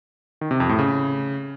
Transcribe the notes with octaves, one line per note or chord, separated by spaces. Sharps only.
D#3
C3
F2
A2
C#3